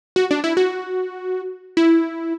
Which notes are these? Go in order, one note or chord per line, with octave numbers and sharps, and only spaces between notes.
F#4
D4
E4
F#4
E4